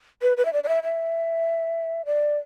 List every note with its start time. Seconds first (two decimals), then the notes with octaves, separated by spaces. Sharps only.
0.22 B4
0.37 B4
0.45 E5
0.53 D5
0.64 D5
0.68 E5
0.83 E5
2.05 D5